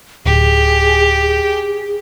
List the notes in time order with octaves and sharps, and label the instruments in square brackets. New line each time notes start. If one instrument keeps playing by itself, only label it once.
[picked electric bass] D1 [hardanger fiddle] G4 [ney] G#4